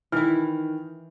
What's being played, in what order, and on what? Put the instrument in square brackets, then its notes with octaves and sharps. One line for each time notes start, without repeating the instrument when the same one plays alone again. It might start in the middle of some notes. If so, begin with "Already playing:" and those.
[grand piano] D#3 F6 [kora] E3 E4